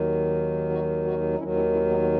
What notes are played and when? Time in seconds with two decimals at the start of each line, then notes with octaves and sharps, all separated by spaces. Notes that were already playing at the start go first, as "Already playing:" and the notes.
Already playing: D#2 D#3 F#3
0.70 D#4 F#4
1.04 D#4 F#4
1.34 D#4
1.38 D#2 D#3 F#3 C#4 E4
1.56 C#4 E4
1.73 C#4 E4
1.90 B3 D#4
2.03 B3